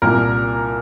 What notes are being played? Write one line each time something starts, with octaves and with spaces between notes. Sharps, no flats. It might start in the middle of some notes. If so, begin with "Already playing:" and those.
C2 A#2 A#4